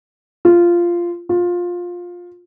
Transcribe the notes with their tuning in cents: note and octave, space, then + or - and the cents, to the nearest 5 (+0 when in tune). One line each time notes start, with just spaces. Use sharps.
F4 -10
F4 +15